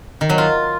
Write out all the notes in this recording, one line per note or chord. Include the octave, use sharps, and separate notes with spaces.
D#3
F#3
F4